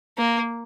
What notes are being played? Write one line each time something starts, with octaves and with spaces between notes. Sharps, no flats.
A#3